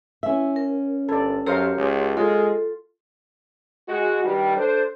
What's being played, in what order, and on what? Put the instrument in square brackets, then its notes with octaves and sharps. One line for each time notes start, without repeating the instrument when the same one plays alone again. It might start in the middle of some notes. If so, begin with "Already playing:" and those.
[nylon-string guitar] C#4 E5 [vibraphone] E4
[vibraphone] A#4
[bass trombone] G1 [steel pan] A4 D5
[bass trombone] F#2 [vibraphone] G4 C#5 C6 [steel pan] A#4 C5 F5
[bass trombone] C#2
[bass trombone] G#3 [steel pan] F4 [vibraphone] A4
[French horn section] G#3 F#4
G2 D#3 G3
D4 A4 C5